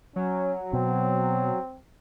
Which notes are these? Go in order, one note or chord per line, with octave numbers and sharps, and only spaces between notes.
F#3 C#4
B2 C4